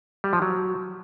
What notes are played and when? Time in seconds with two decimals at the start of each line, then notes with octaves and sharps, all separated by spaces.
0.24 G3
0.33 F3
0.42 F#3